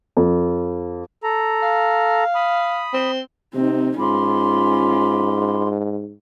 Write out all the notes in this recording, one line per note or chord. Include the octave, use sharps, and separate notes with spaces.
F2
A4 A#5
F5
B5 D#6
C4
C3 C4 D#4
G#2 C#4 F4 B5 C6 D6